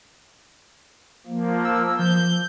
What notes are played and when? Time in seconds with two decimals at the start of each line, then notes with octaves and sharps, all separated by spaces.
1.27 F3 A#3
1.65 E6
1.99 F3 G6